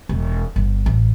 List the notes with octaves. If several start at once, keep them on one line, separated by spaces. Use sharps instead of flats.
E1
G1
A1